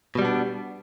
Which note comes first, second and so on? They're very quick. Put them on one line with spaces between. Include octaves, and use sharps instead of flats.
B2 G3 B3 D4